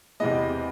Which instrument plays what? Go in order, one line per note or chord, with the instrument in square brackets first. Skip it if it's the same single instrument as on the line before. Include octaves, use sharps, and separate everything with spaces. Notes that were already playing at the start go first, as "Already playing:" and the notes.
[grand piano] E2 C3 E3 G#3 B3 D#5